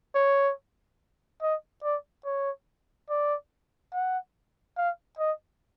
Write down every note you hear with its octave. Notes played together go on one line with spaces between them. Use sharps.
C#5
D#5
D5
C#5
D5
F#5
F5
D#5